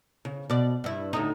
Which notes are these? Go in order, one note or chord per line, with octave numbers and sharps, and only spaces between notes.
C#3
B2 D5
G2 E4
D2 A2 D#4